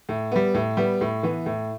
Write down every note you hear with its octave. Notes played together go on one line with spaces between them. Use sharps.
A2
G3 B3
A2
G3 B3
A2
E3 B3
A2